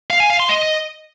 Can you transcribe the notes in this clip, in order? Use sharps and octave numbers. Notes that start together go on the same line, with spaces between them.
F5
G#5
F5
C6
D#5